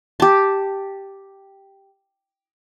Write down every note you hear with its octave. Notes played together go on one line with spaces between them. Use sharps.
G4 A5